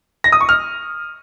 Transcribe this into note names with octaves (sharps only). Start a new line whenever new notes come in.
A#6
D#6
C#6
F6